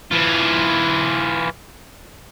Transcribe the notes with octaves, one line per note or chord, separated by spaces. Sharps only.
E3 F4